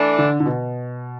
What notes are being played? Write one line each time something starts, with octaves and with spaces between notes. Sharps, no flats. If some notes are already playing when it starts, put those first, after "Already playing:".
Already playing: E3 A3 D4
D3
D3
B2